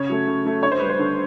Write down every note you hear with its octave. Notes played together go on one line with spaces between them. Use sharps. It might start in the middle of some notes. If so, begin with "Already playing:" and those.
Already playing: C#3 C#5
F#3 A3
C#3
F#3 A3
D3 C#5
C5
G3 B4
C5
D3